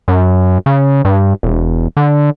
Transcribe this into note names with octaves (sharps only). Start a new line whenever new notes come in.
F#2
C#3
G2
E1
D3